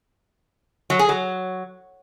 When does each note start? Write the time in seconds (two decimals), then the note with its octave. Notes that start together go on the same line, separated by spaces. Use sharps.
0.90 F#3
0.99 G#4
1.09 F#3